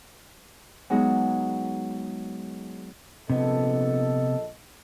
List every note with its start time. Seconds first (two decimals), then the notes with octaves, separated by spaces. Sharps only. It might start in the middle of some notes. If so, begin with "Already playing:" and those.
0.90 F#3 G#3 B3 D#4
3.30 A#1 C3 B3 A4 D#5